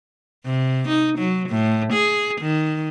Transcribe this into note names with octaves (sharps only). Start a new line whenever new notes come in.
C3
D#4
F#3
A2
G#4
D#3